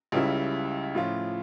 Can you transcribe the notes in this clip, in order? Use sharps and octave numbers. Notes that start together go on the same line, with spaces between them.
C#2 C#3 G3 C#4 E4
A2 F3 C#4 F4